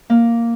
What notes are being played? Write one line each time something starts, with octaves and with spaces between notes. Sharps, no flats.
A#3